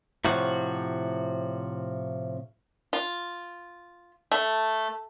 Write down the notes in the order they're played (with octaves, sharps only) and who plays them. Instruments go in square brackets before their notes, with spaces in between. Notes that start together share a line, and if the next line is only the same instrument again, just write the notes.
[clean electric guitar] A2 C3 F3 F#4
[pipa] F4
A3